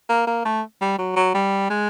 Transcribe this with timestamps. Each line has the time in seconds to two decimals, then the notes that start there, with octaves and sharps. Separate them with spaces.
0.10 A#3
0.27 A#3
0.46 A3
0.81 G3
0.99 F#3
1.16 F#3
1.35 G3
1.70 G#3